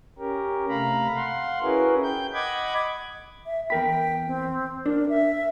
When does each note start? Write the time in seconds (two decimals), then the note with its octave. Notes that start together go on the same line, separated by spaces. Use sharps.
0.18 C#4 G4 A#4
0.69 C3 A3 F5 A#5 B5
1.16 F5 F#5 C6
1.62 C#4 E4 F#4 G#4 A#4 B4
2.03 G5 G6
2.34 D#5 F#5 B5 D6 G#6
3.46 E5
3.70 E2 A#4 G5 B5
4.26 C4
4.86 D4 A#4
5.09 E5